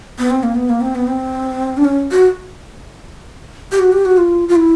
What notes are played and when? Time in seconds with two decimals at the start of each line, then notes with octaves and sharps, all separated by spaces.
0.19 B3
0.31 C4
0.43 A#3
0.55 B3
0.69 A#3
0.81 C4
0.95 B3
1.07 C4
1.77 D4
1.84 C#4
2.11 F#4
3.72 G4
3.79 F#4
3.92 G4
4.05 F#4
4.18 F4
4.48 F4
4.56 E4